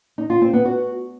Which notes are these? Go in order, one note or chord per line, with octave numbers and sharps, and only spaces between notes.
D#4
F4
C4
B3
F#4